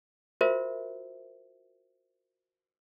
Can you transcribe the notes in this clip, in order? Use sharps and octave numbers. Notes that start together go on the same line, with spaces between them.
F4 F#4 A#4 C5 E5